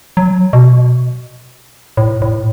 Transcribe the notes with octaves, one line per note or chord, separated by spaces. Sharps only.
F#3
B2
A2
A2